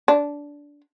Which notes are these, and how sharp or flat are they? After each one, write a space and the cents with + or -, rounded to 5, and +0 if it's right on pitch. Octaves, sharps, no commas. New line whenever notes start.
D4 -15